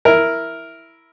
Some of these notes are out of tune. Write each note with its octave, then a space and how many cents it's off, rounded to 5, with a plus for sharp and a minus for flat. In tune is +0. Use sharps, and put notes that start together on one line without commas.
E4 +0 A#4 +0